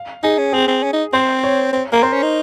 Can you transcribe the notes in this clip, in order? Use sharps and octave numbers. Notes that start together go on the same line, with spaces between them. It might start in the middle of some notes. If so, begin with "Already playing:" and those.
Already playing: F5
D#4 G#4
C#4
C4 G#4
C4
C#4
D#4
C4 C5
C#5
C4
A#3 A#4
C4 C5
C#4
D#4